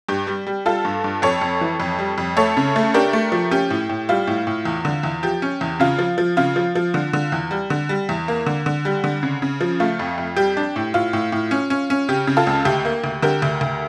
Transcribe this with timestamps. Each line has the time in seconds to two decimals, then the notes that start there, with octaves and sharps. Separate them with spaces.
0.08 G2 G4
0.27 G3
0.47 G3
0.66 G3 F4 A4
0.85 G2
1.04 G2
1.22 F2 A4 C#5
1.41 F2
1.61 E3
1.80 F2
1.99 G3
2.18 F2
2.37 A3 A4 C#5
2.57 C#3
2.76 A3
2.94 D4 G4 A#4
3.13 A3
3.32 F3
3.51 C#4 G4
3.70 A2
3.89 A2
4.09 G3 F4
4.27 A2
4.47 A2
4.65 E2
4.85 D3
5.03 E2
5.23 F3 G4
5.42 C#4
5.61 E2
5.80 C#3 F4
5.99 F3
6.18 F3
6.37 C#3 F4
6.56 F3
6.75 F3
6.94 D3
7.13 D3
7.32 E2
7.51 G3
7.70 D3
7.89 G3
8.09 E2
8.28 A#3
8.46 D3
8.66 D3
8.85 G3
9.04 D3
9.23 C#3
9.42 C#3
9.61 F3
9.80 A3 F4
9.99 F2
10.18 F2
10.36 G3 G4
10.57 D4
10.76 A2
10.94 A2 F4
11.13 A2
11.32 A2
11.51 C#4
11.70 C#4
11.90 C#4
12.09 C#3 G4
12.27 C#3
12.37 F4 A4
12.47 C#2
12.65 D2 G4
12.85 A#3
13.04 D2
13.22 D3 G4 A#4
13.42 D2
13.61 D2